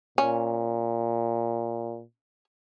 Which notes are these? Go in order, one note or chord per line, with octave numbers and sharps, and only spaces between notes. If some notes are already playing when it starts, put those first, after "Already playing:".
A#2 C#4